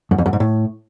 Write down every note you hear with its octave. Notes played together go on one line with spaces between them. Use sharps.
F#2
F2
F#2
G#2
A2